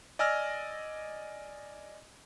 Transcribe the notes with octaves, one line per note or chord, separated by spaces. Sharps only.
D5 D#5 G#5 E6 F6 A#6